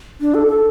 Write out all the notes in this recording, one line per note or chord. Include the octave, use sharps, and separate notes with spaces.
D4
A4
A4